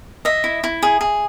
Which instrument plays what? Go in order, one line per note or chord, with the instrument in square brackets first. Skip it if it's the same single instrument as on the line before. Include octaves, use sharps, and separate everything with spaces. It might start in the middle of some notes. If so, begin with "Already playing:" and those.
[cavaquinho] D#5 E5
E4
E4
G#4
G#4